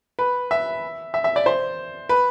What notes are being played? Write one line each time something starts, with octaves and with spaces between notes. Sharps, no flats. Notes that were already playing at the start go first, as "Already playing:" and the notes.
B4
E5
E5
E5
D5
C5
B4